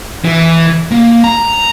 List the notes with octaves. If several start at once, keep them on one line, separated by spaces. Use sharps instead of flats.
E3
A#3
A#5